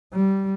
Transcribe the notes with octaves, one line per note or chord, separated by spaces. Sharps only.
G3